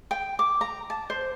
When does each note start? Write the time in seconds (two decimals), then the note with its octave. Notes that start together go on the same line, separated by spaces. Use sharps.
0.11 G5
0.39 D6
0.61 A#5
0.90 A5
1.10 C5